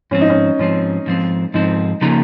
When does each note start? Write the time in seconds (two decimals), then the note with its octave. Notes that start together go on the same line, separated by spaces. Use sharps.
0.11 G#2 F3 C4 C#4
0.21 D#4
0.29 C#4
0.59 G#2 F3 C4 C#4
1.06 G#2 F3 C4
1.54 G#2 F3 C4 D#4
2.02 C#3 F3 A#3 D#4